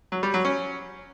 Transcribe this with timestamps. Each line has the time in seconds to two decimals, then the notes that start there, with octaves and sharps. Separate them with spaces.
0.12 F#3
0.23 G3
0.34 F#3
0.45 C#4